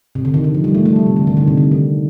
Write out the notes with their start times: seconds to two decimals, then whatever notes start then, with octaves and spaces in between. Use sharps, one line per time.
0.15 C3
0.25 D3
0.34 D#3
0.44 D#3
0.54 F3
0.64 G3
0.75 A3
0.85 A3
0.96 G3
1.06 C3
1.16 D3
1.27 D#3
1.37 D3
1.47 C3
1.57 D3
1.71 D#3